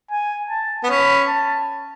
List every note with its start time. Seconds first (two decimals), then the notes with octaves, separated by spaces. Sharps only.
0.11 G#5
0.50 A5
0.83 B3
0.89 C#4 B5
1.28 A5